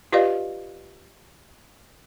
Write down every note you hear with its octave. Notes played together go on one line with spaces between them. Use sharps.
F4 G4 B4 D5 D#5 F5